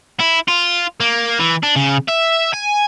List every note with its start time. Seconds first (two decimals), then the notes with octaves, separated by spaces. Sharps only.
0.20 E4
0.48 F4
1.00 A#3
1.40 E3
1.63 D4
1.76 C#3
2.08 E5
2.53 G#5